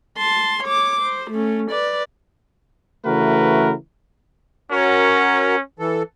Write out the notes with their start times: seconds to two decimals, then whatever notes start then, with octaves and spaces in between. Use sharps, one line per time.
0.18 A5 C6
0.63 C#5 D6
1.02 C5
1.31 A3 C#4
1.71 B4 D5
3.06 C#3 E3 A3 F#4 A#4 B4
4.71 C#4 F#4 A#4 C#5
5.79 E3 A4